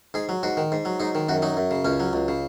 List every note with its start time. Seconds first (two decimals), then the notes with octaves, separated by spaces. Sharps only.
0.14 G#2 G#4
0.29 F#3
0.43 G#2 F#4
0.57 D#3
0.72 G#2
0.85 F#3
1.00 G#2 D#4
1.15 D#3
1.29 F#2 F#4
1.42 F#3 D#4
1.57 F#2
1.71 C#3
1.85 C#2 C#4
2.00 F#3
2.13 C#2
2.28 C#3